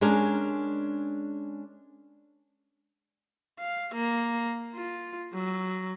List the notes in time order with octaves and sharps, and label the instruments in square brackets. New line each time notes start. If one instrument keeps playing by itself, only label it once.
[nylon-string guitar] G#3 C#4 D4 G#4 A#4 G#5
[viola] F5
A#3
F4
F#3